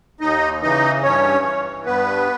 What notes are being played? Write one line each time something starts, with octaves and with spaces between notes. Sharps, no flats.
D#2 D#4 D#5
C#3 E3 D#4 D#5
G2 C#4 C#5
E3
G2 B3 B4